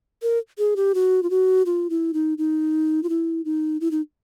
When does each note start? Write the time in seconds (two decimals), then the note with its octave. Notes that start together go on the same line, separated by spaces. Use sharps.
0.22 A#4
0.58 G#4
0.76 G4
0.94 F#4
1.23 F4
1.30 F#4
1.66 F4
1.90 E4
2.14 D#4
2.38 D#4
3.03 F4
3.09 E4
3.45 D#4
3.81 E4
3.91 D#4